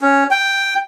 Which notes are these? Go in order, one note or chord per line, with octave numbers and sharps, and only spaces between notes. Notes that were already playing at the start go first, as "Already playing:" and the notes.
C#4
G5